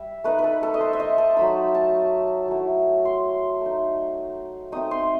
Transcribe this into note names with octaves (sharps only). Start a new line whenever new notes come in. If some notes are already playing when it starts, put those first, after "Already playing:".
Already playing: G3 E5
A3 D#4 B4
B4
A4
A4
D#5
C5
E5
D#5
A5
F#3 A3 D#4 B5
A5
F#3 A3 E4
C6
A3 D#4
A3 C4 D#4 D#6
C6